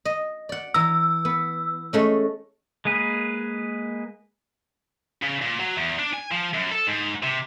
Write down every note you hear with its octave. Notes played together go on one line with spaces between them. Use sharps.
D#5
D5 F#5
E3 A#5 E6
B3
G#3 A3 C#4
G#3 A#3 G#4 B4
C#3
A#2
F#3
E2
D4
G#5
F3
F#2
A4
G#2
C3